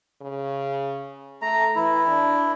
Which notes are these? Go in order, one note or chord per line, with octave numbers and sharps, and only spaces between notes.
C#3
A3 A#5
E3 E4
D4